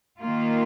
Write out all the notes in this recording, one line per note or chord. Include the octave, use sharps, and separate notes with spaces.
D#3 A#3 F4